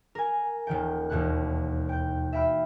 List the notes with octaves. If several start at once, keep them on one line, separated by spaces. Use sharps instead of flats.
A#4 G#5
D#1 D#3 G5
E1 D#2 B2 F#6
G5 G6
E5 F5 G5 B5 F6